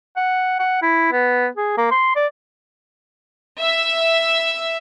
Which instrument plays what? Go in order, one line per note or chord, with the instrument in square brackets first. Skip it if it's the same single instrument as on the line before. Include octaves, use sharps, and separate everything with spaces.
[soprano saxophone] F#5
F#5
E4
B3
G#4
A#3
C6
D5
[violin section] E5